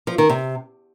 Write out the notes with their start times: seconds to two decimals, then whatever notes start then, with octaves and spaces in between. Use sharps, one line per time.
0.07 F3
0.18 D#3
0.29 C3